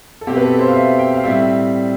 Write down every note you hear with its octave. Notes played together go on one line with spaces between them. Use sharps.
A4
B2 A3 C4 G4
B4
A4
C5
F5
E5
G5
F5
A2 G3 C4 E5